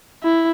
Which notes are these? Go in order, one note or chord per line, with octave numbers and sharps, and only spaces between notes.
E4